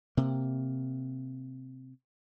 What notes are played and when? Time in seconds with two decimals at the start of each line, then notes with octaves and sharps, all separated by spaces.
0.17 C3 A#3